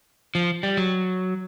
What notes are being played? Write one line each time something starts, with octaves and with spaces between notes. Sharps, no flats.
F3
G3
F#3